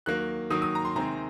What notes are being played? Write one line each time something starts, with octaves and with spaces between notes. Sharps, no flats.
D#3 F#3 A#3 F#6
D#3 F#3 A#3 D#6
D#6
A#5
C6
C3 D#3 G#3 C4 A#5